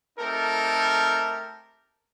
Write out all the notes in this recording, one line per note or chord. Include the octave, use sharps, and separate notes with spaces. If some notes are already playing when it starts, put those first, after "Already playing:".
A3 C4 D#4 G4 A4 A#4